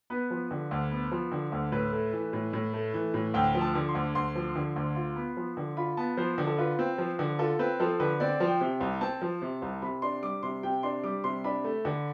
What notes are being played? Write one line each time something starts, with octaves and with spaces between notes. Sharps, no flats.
B3 B4
F3
D3
D2
B3
F3
D3
D2
A2 B4
A3
E3
A2
A2
A3
E3
A2
D2 G5
F3
A5
D3
C6
D2
D2 C6
F3
D3
D2
F4
B3
F3
D3
F4 B5
B3 A5
F3 C5
D3
A4
F4 B4
C4
F3
D3
F4 A4
C4 B4
F3 A4
D3 B4
C4 D5
F3
G5
C3
C2
C4 A5
F3
C3
C2
C3 B5
D4 C6
G3 D6
C3 C6
C3 G5
D4 C6
G3 D6
C3 C6
D4 B5
A3
D3